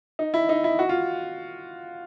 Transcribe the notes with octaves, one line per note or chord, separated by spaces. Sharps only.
D#4
E4
D#4
E4
F#4
F4